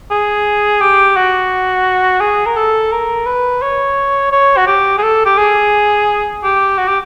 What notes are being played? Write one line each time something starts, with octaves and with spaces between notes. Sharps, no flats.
G#4
G4
F#4
G#4
A#4
A4
A#4
B4
C#5
C#5
F#4
G4
G#4
A4
G4
G#4
G4
F#4
G4